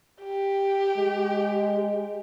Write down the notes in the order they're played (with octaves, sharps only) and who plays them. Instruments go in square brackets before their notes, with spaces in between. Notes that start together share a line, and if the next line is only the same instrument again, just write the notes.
[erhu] G4
[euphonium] G#3